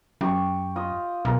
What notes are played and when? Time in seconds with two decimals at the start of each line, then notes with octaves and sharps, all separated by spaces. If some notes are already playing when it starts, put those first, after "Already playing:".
0.21 F#2 G4 C#6
0.76 F4 D#5
1.25 B1 G#4 A#4 D#5